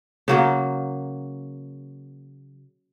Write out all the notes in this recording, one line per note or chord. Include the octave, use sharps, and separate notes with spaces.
C#3 F#3 A#3